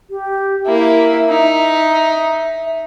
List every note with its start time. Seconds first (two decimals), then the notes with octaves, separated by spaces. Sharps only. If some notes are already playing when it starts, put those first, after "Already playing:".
0.10 G4
0.66 A#3 E4 E5
1.29 D#4